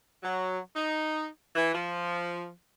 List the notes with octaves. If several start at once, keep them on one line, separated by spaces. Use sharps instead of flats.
F#3
D#4
E3
F3